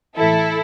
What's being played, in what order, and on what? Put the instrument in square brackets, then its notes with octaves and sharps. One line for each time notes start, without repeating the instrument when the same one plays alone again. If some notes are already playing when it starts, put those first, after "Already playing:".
[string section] A2 E3 E4 A4